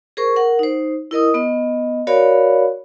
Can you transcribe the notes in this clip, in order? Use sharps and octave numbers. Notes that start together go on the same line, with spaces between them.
G#4 A#4 C5 C#6
A#4 F#5
D#4 C5
E4 A#4 D#5 D#6
B3 D#5
F#4 A#4 C#5 D5 F5 B5